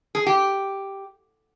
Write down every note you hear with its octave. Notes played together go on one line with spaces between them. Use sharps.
G#4
G4